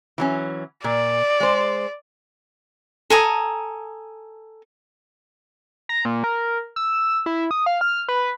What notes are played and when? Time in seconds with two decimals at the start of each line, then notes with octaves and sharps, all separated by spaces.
0.18 E3 F#3 C#4
0.84 A#2 D5
1.40 G#3 C5
3.10 A4 G#5 A#5 D#6
5.89 A#5
6.05 A#2
6.24 A#4
6.76 E6
7.26 E4
7.51 D#6
7.66 F5
7.81 F6
8.08 B4